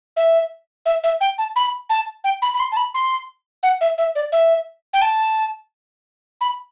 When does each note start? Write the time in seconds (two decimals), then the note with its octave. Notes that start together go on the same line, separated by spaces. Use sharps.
0.17 E5
0.86 E5
1.04 E5
1.21 G5
1.38 A5
1.56 B5
1.90 A5
2.24 G5
2.42 B5
2.54 B5
2.60 C6
2.72 A5
2.77 B5
2.94 C6
3.63 F#5
3.81 E5
3.98 E5
4.15 D5
4.32 E5
4.93 G5
5.02 A5
6.41 B5